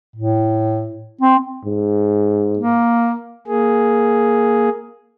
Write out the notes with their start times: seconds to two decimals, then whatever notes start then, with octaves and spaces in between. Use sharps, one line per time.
0.16 A2
1.21 C4
1.65 G#2
2.58 A#3
3.47 A#3 G#4